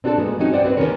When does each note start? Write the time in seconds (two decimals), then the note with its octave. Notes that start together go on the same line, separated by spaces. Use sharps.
0.04 C4 D4 F#4 G#4 A4 C5
0.17 A#2 G#3 B3
0.39 C4 C#4 D#4 F#4
0.53 C5 D5 F#5 G5
0.65 C4 B4
0.77 D#2 B2 D#3 C#4 A#4 C#5